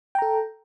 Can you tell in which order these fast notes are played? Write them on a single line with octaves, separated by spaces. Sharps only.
G5 A#5 A4